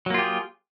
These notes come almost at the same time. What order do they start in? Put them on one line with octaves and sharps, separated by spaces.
F#3 A#3 F4 G4 G#4